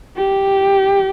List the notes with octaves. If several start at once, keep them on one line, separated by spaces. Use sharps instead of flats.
G4